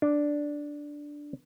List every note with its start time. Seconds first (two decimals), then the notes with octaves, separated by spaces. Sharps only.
0.02 D4